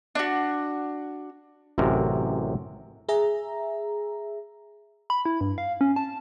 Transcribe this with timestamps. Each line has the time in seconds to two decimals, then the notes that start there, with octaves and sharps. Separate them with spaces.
0.15 D4 F#4
1.78 A1 F#2 C3 A#4
3.09 G#4 E5 A#5
5.10 B5
5.25 E4
5.41 G2
5.58 F5
5.81 C#4
5.96 A5